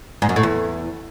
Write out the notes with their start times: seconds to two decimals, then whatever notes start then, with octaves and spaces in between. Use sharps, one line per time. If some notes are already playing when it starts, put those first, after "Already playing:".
0.22 G#2
0.29 F#2
0.36 A2
0.43 E2